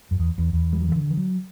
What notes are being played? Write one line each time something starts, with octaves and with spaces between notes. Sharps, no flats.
F#2
E2
E2
E2
G3
F#3
E3
D3
E3
F#3